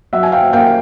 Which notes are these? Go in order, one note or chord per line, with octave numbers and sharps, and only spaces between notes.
F#3 E5 F#5
G#5
F5 G5
A#3 F5 G5